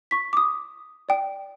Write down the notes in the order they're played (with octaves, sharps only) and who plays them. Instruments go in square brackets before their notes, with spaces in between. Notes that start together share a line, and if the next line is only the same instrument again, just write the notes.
[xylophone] C#6 B6
D6 D#6
D5 G5